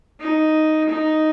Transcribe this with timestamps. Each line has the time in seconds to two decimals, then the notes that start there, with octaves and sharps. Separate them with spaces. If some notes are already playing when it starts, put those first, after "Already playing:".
0.20 D#4
0.89 D#4